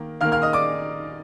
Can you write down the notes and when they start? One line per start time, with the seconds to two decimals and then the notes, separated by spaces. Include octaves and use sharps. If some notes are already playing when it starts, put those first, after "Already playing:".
Already playing: D#3 A#3
0.21 D#3 A#3 F5 F6
0.32 F5 F6
0.42 D#5 D#6
0.53 D5 D6